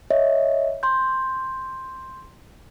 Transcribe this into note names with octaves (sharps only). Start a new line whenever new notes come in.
C#5 D#5 E5
C6 G6